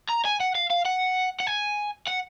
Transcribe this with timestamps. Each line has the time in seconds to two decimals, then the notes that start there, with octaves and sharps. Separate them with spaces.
0.09 A#5
0.25 G#5
0.40 F#5
0.55 F5
0.70 F5
0.85 F#5
1.40 F#5
1.47 G#5
2.07 F#5